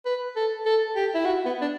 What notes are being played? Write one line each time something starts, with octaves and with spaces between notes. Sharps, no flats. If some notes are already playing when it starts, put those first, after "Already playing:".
B4
A4
A4
G4
E4
F#4
B3
D4